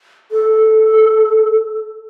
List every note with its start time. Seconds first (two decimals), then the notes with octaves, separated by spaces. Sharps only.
0.31 A4